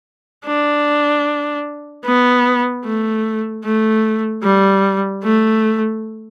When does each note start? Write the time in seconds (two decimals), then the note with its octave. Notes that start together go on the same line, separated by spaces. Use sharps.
0.46 D4
2.05 B3
2.84 A3
3.65 A3
4.43 G3
5.23 A3